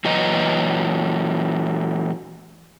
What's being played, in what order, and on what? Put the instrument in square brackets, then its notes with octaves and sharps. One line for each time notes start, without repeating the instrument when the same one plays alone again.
[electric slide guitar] A#2 E3 F#3 B4 D#5 A#5